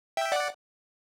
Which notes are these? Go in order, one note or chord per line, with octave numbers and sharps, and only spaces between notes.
E5 G5
D5 F#5